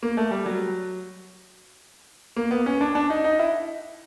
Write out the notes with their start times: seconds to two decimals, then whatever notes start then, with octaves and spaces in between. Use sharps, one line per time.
0.03 A#3
0.17 A3
0.31 G3
0.46 F#3
2.36 A#3
2.51 B3
2.66 C#4
2.81 D4
2.95 D4
3.10 D#4
3.24 D#4
3.39 E4